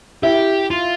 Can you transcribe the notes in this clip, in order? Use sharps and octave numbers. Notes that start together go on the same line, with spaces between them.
E4 G4
F4